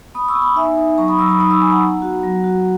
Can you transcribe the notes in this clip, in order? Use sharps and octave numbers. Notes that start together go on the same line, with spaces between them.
B3 B5 D#6
C#6 E6
B3
B5 D#6
D#4 E5 G#5
D#4
F#3 A#5 C#6
B5 D#6
F#3 C#6 E6
B5 D#6
D#4 B5 D#6
C#6 E6
B3 G#5 B5
F#5 A#5
B3
F#4
F#3
F#4